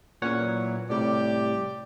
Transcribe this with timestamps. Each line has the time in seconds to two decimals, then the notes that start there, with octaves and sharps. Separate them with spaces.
0.22 E2 A#2 C#4 C#5 F#5
0.38 E3 F#3
0.90 A2 C3 G3 G4 D5